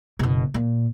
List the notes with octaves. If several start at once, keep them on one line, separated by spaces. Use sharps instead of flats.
F#1 B2
A#2